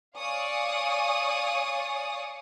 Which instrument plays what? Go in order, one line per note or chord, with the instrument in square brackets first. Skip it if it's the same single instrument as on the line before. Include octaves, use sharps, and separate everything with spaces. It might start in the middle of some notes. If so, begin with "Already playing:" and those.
[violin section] C#5 D5 F5 G#5 C#6 D#6